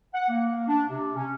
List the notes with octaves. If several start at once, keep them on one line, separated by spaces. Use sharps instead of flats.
F#5
A#3
D4
C3
C#4